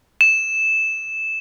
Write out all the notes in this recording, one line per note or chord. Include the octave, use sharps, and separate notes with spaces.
E7